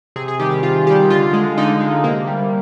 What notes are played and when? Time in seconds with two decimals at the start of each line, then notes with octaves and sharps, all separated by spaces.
0.16 C3 G#4
0.28 G#4
0.39 D#3 G3 G4
0.51 G4
0.63 C3 F4
0.87 D#3 G3 G4
1.10 D3 F4
1.33 G#3
1.58 D3 D#4
1.81 G#3
2.04 C3 A#3
2.27 G3